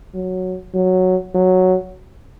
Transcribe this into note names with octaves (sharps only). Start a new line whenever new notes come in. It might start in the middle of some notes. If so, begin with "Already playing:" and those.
F#3
F#3
F#3